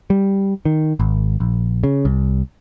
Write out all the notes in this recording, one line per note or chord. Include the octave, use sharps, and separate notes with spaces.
G3
D#3
G#1
A#1
C#3
C2